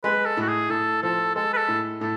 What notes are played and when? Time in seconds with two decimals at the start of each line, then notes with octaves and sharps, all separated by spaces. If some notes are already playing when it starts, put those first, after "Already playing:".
0.04 G#3 B4
0.26 A4
0.37 A2 F#4
0.48 G#4
0.70 A2 A4
1.03 F3 A4
1.35 G#3 A4
1.53 B4
1.57 A4
1.68 A2
2.01 A2 A4